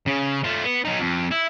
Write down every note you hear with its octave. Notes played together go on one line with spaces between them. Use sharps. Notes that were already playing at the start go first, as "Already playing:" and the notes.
C#3
A3 F4
B3
F#3 D#4
F2
E4